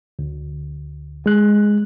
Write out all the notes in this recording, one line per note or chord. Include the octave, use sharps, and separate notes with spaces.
D2
G#3 F#6